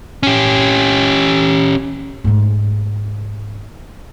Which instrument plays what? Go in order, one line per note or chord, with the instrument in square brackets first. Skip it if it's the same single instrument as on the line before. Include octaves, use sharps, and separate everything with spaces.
[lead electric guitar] C#4 G4
[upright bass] G#2 A3